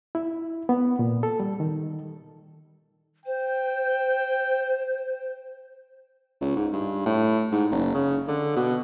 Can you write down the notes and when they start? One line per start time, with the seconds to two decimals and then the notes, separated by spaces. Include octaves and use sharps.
0.15 E4
0.69 B3
0.99 A#2
1.23 A4
1.40 G3
1.60 D#3
3.26 C5 G5
6.41 C#2
6.56 G#2
6.73 G2
7.06 A2
7.52 G#2
7.71 F#1
7.94 C#3
8.28 D3
8.56 B2